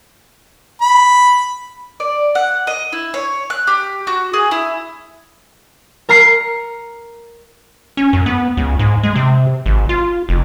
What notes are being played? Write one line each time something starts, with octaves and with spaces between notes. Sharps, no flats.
B5
D5
F#5
D#5
E4
C#5
F#6
G4
F#4
G#4
E4
A#4 A#5 F6 C7 C#7
C#4
F#2
B3
C#2
G#2
G#3
C3
G#1
F4
F1